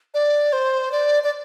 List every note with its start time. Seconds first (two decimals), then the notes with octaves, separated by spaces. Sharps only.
0.14 D5
0.53 C5
0.92 D5
1.23 D5